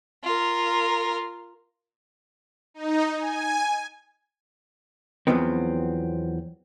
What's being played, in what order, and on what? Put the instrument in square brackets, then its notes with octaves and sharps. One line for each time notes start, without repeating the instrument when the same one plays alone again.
[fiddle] F4 A#4
[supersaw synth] D#4
G#5
[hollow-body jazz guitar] E2 G2 F3 F#3 B3 C4